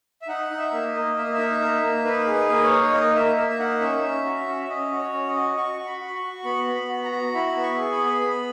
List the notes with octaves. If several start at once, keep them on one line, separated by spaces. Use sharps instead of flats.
E5
D#4 F#5
D#4
E5
A#3
D#5
A#3
A#3 E5
D#5
E5
D#4
A#3
A#3
D#4 B4
G#4
B4
A#3
C#5
D#4
A#3 D#5
A#3 E5
A#3 E5
E5
D#4 F#5
C#4 E5
C#4
F#4
C#4
E5
C#4 D#5
F#4
C#5
C#4
D#5
F#4
F#4 C#6
F#4
B5
F#4
C#6
F#4
B3 B5
B3
B5
F#4
A#5
F#4
E4 B5
B3
C#6
G#4
B5
B3
B3